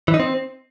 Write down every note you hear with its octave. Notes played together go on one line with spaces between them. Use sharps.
E3
D#4
C4